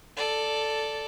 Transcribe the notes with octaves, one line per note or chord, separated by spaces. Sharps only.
A4 D5